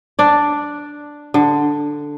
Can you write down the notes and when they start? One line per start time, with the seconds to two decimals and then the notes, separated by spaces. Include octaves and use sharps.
0.19 D4 D5
1.34 D3